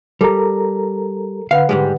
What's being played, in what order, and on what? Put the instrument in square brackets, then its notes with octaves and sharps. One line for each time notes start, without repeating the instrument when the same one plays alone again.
[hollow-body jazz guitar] G3 [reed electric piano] A4 A#4 A#5
[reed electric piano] D3 B4 F#5 [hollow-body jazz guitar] F5
[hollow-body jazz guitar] G#2 G3 G#3